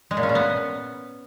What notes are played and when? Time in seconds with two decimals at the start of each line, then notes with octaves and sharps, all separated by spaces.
0.11 G#3
0.17 A#2
0.23 C#4
0.29 A#2
0.35 B3